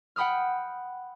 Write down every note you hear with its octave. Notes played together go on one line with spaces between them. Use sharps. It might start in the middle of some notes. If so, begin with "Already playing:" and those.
F#5 G5 B5 D#6 F6